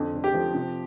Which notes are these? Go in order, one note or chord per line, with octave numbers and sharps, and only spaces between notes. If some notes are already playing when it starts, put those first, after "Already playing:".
Already playing: F2 D3
F1
G4
F3
C3